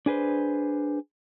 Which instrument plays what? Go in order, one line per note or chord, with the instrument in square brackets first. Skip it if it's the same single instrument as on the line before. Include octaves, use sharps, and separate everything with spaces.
[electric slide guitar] D4 G#4 B4 C5